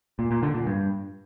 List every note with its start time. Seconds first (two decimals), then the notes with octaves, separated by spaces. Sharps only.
0.19 A#2
0.31 A#2
0.43 D3
0.55 A#2
0.67 G2